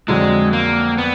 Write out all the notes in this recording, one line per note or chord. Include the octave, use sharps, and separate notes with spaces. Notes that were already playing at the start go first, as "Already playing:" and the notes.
F2 D3 F#3 G#3
A#3
B3